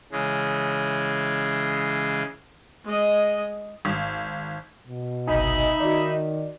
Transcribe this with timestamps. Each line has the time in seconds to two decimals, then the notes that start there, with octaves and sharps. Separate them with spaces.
0.12 C#3 E3 G#3
2.85 G#3 D#5
3.85 G#1
4.87 B2
5.27 G1 C2 D#4 E5 G#5 B5
5.80 D#3 F#4 D5